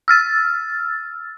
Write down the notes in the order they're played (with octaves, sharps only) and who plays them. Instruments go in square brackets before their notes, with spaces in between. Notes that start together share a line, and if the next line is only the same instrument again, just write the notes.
[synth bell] E6 F6 A6